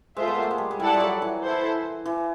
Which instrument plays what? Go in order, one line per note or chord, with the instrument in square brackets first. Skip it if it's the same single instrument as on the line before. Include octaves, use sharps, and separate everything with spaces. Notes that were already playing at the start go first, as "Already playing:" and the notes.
[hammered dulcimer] G#3 [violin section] F4 A4 C5 E5
[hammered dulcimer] B3
A#3
A3
G#3
G3
G#3
[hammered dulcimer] G3 [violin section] E4 A4 D5 F#5 A5
[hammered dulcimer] F3
F#3
E3
[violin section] E4 A4 C5
[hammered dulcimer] E3